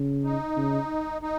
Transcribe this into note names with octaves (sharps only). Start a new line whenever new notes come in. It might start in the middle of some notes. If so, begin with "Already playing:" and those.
Already playing: C#3
D#4
C#3
D#4